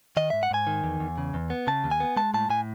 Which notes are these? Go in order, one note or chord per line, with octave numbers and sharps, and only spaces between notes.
D#3 D#5
G#2 E5
F#5
G#2 G#5
D#3
E2
E2
C#3
E2
B3
C#3 A5
D#2
G#5
B3
G#3 A5
A2 A5
A2 G#5